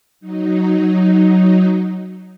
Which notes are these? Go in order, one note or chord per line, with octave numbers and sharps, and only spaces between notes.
F#3 D#4